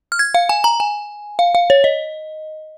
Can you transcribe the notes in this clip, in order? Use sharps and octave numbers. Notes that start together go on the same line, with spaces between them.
F6
G#6
F5
G#5
A#5
G#5
F5
F5
C#5
D#5